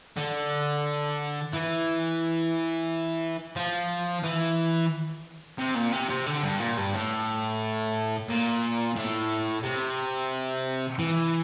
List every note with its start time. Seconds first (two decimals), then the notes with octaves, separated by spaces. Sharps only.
0.17 D3
1.53 E3
3.56 F3
4.24 E3
5.58 C3
5.75 A#2
5.92 C3
6.10 C3
6.26 D3
6.43 G2
6.60 A#2
6.77 G2
6.93 A2
8.29 A#2
8.96 A2
9.63 C3
10.99 E3